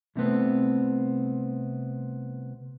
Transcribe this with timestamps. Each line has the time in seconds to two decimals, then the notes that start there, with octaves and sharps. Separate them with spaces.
0.16 C2 C3 A3 B3 C4